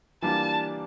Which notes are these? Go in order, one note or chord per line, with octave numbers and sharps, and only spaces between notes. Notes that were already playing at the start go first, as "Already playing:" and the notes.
E3 G3 A#3 D4 F4 A5